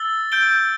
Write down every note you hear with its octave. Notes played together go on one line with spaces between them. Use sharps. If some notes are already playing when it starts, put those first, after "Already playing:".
Already playing: E6 A6 G7
G6 D7 G7